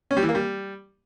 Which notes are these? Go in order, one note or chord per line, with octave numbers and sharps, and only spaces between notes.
C#4
G3
E3
A#3
G3